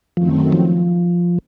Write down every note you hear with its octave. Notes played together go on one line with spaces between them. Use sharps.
F#2 D#3 F3 F#3 A3 C4
F3